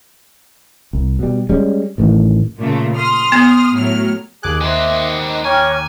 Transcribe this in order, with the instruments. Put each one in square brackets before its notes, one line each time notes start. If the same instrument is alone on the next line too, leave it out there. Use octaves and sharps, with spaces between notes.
[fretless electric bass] C2
B2 G3
G3 G#3 C#4
A1 A2 D#3 E3
[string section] A#2 C#3 A3
C6 D#6 F6
[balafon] B3
[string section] A2 F#3 F6
[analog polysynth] D#2 D6 F#6 [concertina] G#4 G#5
[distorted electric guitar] D#3 C5 [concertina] D#5 [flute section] E5
[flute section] D#5
[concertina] C#5 [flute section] G5 A#5 F6 [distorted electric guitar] G#5